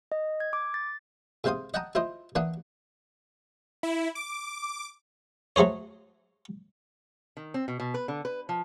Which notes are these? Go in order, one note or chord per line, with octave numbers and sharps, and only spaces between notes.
D#5
G#6
D6
A6
G#2 C3 C4 C5 F5 D#6
D#5 F#5 G5 A5 A#5 D#6
E4 F4 C5 D#5
E3 A#3 D4 F#5 D#6
E4
D6
F#3 A3 G#4 C5 C#5
D#3
C4
B2
B2
B4
D3
B4
F3